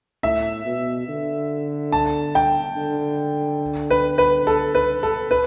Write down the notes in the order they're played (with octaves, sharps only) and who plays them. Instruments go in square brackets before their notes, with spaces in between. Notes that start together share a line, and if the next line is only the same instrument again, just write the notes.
[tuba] A2 [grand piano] E5
[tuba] B2
D3
[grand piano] A5
G5
[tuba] D3
[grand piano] B4
B4
A4
B4
A4
B4